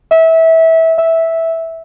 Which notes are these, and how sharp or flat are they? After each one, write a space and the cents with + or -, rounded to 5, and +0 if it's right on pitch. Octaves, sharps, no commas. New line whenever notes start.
E5 -20
E5 -10